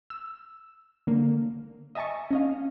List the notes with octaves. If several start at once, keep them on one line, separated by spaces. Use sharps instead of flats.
E6
D3 A#3
D#5 E5 G#5 A5 C#6
C#4 D#5 F5